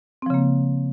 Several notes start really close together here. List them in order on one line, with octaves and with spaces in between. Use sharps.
C4 F3 C#3 A#3